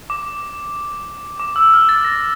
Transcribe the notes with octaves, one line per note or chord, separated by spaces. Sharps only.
D6
D6
E6
F6
A6
A#6